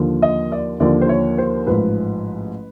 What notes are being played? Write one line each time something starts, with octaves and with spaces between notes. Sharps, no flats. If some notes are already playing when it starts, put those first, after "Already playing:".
Already playing: D#2 D3 F3
D#5
D5
D#2 D3 F3 D5
C5
C#5
C5
A1 G#2 F3 B4